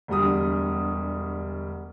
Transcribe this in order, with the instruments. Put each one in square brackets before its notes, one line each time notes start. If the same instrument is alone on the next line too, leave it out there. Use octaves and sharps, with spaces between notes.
[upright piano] E1 D2 G3 D#6